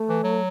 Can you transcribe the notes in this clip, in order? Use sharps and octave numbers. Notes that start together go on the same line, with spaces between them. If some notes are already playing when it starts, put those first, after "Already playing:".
Already playing: A3
E3
F#3